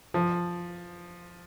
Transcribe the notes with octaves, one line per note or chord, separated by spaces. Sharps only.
F3